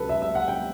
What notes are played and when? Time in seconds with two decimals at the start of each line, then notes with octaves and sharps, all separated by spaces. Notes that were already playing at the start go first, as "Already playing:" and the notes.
Already playing: C#2 C#3 F#3 A4 B4
0.09 E5
0.22 E5
0.35 F#5
0.48 G5